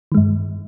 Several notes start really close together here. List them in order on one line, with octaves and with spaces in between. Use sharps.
D#3 G#3 G2